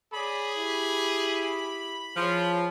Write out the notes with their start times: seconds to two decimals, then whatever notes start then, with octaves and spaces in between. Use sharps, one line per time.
0.13 G#4 C#5 D5 B5
0.56 E4 G4
2.15 F3 G#4 C#5